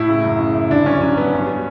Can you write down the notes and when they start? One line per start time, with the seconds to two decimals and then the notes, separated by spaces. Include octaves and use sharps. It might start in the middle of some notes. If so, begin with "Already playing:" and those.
Already playing: A2 E4
0.09 C#3
0.24 F#2
0.39 C#3
0.55 F#2
0.70 D3 D4
0.85 G2 C#4
1.01 F#3 C#4
1.16 G2 B3
1.32 G2 C#4
1.47 G3